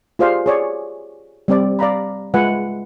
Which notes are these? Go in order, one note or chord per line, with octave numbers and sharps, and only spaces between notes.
F4 G4 G#4 C5 D5 F5
G#4 C#5 D5
G3 C4 D5
D5 F5 A#5 B5
G#3 F4 B4 E5 F#5 G#5